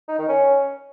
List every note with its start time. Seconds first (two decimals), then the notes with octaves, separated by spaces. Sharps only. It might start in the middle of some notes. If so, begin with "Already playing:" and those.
0.08 D#4
0.18 D#3
0.29 C#4